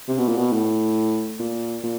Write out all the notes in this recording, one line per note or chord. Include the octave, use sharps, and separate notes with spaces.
C3
B2
A#2
B2
A2
A#2
A#2